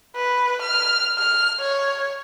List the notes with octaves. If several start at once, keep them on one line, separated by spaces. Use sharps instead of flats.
B4
F6
F6
C#5